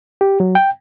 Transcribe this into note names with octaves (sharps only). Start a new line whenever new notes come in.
G4
F#3
G5